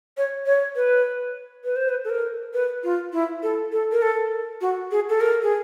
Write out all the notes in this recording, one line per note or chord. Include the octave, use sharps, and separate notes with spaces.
C#5
C#5
B4
B4
C5
B4
A4
A#4
B4
F4
E4
A4
A4
A#4
A4
F#4
G#4
A4
A#4
G#4